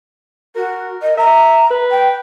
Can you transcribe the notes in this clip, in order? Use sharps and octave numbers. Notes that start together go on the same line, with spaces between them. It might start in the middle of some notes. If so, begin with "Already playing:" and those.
F#4 A#4
D#5
E5 A#5
B4
G5